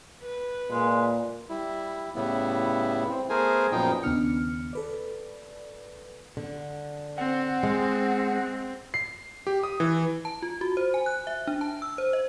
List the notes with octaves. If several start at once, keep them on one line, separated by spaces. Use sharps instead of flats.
B4
A#2 G#3
G3 E4
A2 C#3 G3 B3 E4
C4
A3 B3 G#4 A#4 C5 G#5
F#2 A#2 F3 B3 D#4 G5
D#2 C#3 B3 D4 F6 C#7
A4 B4 D5
D3
C4 F#5
G#3
C7
G4
D#6
E3
A5
F4
F#4
C5
G#5
F#6
E5
D4
A5
E6
C5
D#5